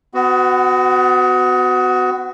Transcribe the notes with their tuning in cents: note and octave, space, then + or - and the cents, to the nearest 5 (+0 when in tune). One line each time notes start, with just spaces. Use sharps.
B3 +35 F#4 +0